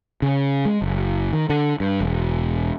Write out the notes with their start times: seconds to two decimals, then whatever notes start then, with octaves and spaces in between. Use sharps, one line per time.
0.22 C#3
0.65 G#3
0.82 F#1
1.33 D#3
1.50 D3
1.80 G2
2.01 E1